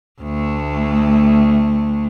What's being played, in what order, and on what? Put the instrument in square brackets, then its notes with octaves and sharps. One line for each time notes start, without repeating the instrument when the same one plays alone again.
[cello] D2 A3